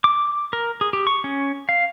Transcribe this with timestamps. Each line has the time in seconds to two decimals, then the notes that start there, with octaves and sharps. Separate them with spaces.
0.04 D6
0.53 A#4
0.81 G#4
0.93 G4
1.07 C#6
1.24 C#4
1.69 F5